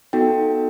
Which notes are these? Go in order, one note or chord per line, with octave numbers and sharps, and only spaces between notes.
B3 D#4 F#4 A4 G5